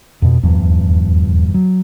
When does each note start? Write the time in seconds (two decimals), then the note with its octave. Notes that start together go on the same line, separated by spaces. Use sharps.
0.22 F2 B2
0.43 D#1 E2 G2 F3
1.54 F#3